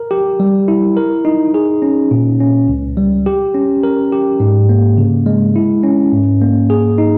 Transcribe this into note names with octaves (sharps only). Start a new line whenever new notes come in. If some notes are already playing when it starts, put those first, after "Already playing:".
Already playing: A#4
G4
G3
E4
A#4
D#4
G#4
C#4
A#2
C#4
C#2
G3
G4
C#4
A#4
G4
G#2
A#3
C#3
G#3
E4
C#4
G#2
A#3
G#4
D#4